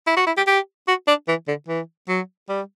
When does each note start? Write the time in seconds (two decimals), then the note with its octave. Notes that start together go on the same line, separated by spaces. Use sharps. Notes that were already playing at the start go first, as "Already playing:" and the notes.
0.07 E4
0.17 F#4
0.27 E4
0.37 G4
0.47 G4
0.88 F#4
1.08 D4
1.28 E3
1.48 D3
1.68 E3
2.08 F#3
2.49 G3